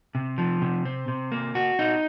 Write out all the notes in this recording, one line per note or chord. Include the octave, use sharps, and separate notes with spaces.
C3
F3
C3
C4
C3
A#3
F#4
D#4